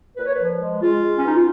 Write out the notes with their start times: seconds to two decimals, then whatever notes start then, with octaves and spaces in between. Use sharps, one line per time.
0.17 A#2 B4
0.26 C#5
0.33 B4
0.38 F3
0.60 G#3
0.81 G#3 F4
1.03 G#3
1.17 C#4
1.24 B2 D#4
1.36 F4